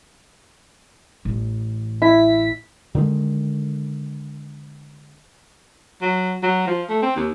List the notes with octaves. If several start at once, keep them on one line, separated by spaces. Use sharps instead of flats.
A1
E4 B6
D3 D#3 G3 G#3
F#3
F#3
F3
A3
C4
D#2